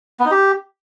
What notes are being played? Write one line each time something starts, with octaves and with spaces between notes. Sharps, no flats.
B3
D#4
G4